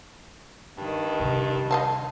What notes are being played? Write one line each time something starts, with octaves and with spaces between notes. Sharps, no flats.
G2 D#3
C3 C#4
D#5 F5 A5